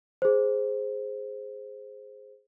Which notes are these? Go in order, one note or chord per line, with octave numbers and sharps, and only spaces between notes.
G#4 C5